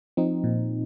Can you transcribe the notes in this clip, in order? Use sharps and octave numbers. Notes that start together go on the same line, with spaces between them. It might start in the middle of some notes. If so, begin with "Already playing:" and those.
F3 C4 D#4
A#2